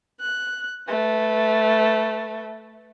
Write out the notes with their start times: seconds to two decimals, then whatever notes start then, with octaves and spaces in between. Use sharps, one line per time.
0.21 F#6
0.88 A3 B4